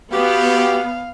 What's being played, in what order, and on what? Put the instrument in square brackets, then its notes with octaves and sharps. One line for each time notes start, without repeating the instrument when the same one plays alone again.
[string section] B3 [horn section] F#4 G4 [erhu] F5